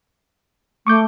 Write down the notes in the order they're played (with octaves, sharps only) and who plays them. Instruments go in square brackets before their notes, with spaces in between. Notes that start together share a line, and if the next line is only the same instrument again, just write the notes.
[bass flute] A3 [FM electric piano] C#6 D6 G6